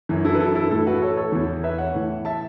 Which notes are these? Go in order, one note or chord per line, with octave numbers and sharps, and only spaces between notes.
F#2 E3
E4 A4
B4
E4 A4
E4 A4
A2 E3 E4 A4
F#4 B4
A4 C#5
A4 C#5
E2 E3
B4 E5
C#5 F#5
A2 E3
E5 A5